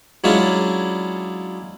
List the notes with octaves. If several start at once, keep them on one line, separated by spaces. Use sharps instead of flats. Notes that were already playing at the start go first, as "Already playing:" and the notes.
F#3 G#3 C#4 D4 E4 F4